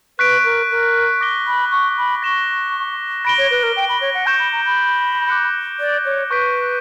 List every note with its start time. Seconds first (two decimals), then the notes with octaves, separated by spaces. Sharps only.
0.19 B4 C#6 F#6 B6 D7
0.44 A#4
0.70 A#4
1.21 D6 A#6 D7 G7
1.47 B5
1.72 C#6
1.98 B5
2.22 C#6 A#6 E7 G7
3.25 B5 A#6 D7 G7
3.38 C#5
3.51 B4
3.63 A#4
3.76 G5
3.89 B5
4.01 C#5
4.14 F#5
4.27 C#6 G6 C#7 E7
4.39 B5
4.52 A#5
4.66 B5
5.29 D6 F#6 C#7
5.80 D5
6.05 C#5
6.30 B4 C#6 G6 B6 D7